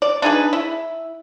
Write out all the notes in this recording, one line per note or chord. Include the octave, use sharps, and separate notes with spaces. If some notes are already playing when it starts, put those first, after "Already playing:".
D5
D4 D#4 G#4 B4
E4